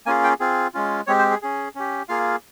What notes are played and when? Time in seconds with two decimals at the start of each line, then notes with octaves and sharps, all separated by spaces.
0.06 A#3 C#4 F4 G#4 G#5
0.24 G5
0.40 C4 F4 G#4
0.74 G#3 C#4 F4
1.07 G#3 C4 G4 C#5
1.19 C5
1.31 G#4
1.42 C#4 G#4
1.75 C#4 G4
2.09 A#3 F4 G#4 F5